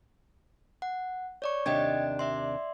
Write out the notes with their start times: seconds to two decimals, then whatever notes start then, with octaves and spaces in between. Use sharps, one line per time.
0.82 F#5
1.42 C#5 D5 C#6
1.66 D#2 C3 D4 D#5 G5 G#6
2.19 D5 E5 C6